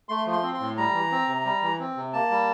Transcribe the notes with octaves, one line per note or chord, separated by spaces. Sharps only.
A3 C6
F3
C6
C4
C6
A2
G3 A#5
E3
C4
C3
G3
E3
C4
C3
A#3 A5
G3